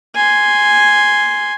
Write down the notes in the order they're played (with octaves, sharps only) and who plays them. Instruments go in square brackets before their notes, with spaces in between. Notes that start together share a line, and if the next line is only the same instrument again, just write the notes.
[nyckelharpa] G#5 C6